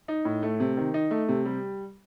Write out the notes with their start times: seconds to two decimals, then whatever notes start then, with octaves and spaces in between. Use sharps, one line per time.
0.08 D#4
0.25 A2
0.43 A3
0.60 C3
0.77 D#3
0.94 D#4
1.11 A3
1.28 C3
1.45 G3